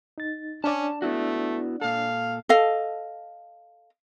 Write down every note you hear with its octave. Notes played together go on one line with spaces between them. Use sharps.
D#4 A6
C#4 D4 D5 A5
A3 B3 E4 F#4
A#2 A4 F5
A4 D#5 F5